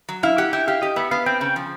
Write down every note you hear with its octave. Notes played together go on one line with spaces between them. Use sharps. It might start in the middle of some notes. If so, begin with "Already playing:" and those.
F#3
E4 F5
G4 F#5
E4 G5
G4 F5
G4 D#5
B3 E5
B3 F5
C4 G5
C#3 G5
F3